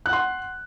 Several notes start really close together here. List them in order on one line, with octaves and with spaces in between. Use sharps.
F#6 F#5 C6